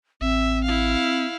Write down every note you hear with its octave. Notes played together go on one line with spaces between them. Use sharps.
A1 C4 E5
E4 F5